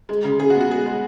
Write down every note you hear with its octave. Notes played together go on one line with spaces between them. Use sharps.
G#3
C#3
C#3 G#4
F#4
B3
F#4
G#3 G#4
G#3